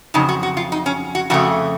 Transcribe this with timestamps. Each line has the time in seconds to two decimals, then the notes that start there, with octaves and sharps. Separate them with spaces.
0.14 F2 C#3 F#3 D#4
0.29 F#4
0.43 F#4
0.57 F4
0.72 D#4
0.86 C#4
1.15 F#4
1.30 F2 C#3 A3 F#4